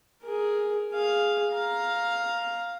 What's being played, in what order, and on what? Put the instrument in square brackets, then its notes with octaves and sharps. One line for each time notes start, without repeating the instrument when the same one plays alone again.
[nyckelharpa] G#4 A#4
G#4 F5
F5 A#5